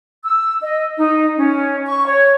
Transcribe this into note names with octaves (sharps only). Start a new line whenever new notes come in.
E6
D#5
D#4
C#4
C#6
C#5